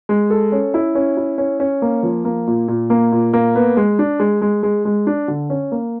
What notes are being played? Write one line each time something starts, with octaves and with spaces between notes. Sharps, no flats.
G#3
A4
C#4
E4
C#4
E4
C#4
C#4
A#3
F3
A#3
A#2
A#2
A#3
A#2
A#3
B3
G#3
D4
G#3
G#3
G#3
G#3
D4
D3
C#4
A#3